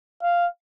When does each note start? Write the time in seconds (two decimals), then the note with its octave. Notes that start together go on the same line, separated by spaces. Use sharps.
0.23 F5